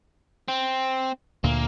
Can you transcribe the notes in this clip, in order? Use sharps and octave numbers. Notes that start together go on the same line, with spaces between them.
C4
D2 A#2 A#3